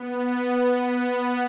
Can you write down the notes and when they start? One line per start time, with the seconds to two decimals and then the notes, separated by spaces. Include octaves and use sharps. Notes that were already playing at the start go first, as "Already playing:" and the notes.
Already playing: B3
0.90 B3